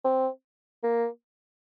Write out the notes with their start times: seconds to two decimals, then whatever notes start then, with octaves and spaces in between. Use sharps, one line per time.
0.04 C4
0.83 A#3